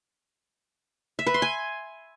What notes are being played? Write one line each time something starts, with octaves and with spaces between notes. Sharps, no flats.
E5
B4
C6
G#5